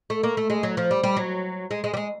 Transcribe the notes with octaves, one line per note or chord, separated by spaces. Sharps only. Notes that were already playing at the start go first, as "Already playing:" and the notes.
A3
A#3
A3
G#3
F#3
F3
G3
G3
F#3
G#3
G#3
G3
G#3